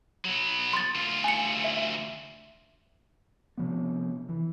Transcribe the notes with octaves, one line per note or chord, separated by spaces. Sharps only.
F#3 B3
C6 A6
D2 F4
G#5 C#7
E5
C3 F3 B3
E3